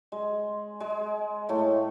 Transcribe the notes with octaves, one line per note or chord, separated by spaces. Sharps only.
G#3
G#3
A2 A3